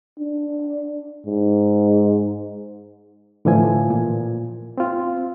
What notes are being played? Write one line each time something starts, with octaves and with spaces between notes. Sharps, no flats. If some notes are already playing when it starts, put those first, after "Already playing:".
D4
G#2
A2 D3 E3 F3 G#5
A#2
C4 F4